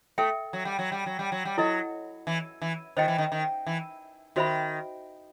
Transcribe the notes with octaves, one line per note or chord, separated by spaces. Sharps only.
A3 A4 E5 G5
F#3
G3
F#3
G3
F#3
G3
F#3
G3
F#3 E4 A4 D#5
E3
E3
D#3 C5 D#5 G5
E3
D#3
D#3
E3
D#3 F#4 C5 E5 B5